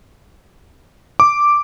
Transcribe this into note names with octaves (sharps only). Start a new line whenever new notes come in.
D6